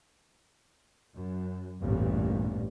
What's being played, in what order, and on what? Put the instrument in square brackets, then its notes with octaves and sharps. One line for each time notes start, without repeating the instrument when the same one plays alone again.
[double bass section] F#2
A1 E2 G2 A#2